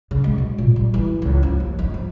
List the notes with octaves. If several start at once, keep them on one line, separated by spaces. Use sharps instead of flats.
C#3
G#3
B2
A#2
G3
E3
C#2
F3
D#2
D#4
F3